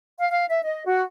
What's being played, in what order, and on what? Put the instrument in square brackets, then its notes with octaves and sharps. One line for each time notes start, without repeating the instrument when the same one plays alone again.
[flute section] F5
F5
E5
D#5
F#4